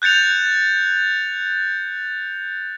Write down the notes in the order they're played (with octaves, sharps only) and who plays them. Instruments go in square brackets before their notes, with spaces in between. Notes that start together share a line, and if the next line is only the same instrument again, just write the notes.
[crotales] F#6 G6 A6 C#7 F7